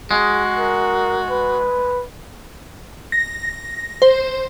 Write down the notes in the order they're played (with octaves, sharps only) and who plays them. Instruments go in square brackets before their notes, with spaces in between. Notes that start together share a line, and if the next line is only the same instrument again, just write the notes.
[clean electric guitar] G#3 [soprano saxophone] F#4 [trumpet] G#4
[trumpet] A#4
B4
[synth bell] A#6
C5